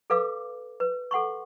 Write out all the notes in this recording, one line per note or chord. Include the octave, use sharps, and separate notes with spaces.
A4 B4 F5 D6
B4
A4 F#5 C6 C#6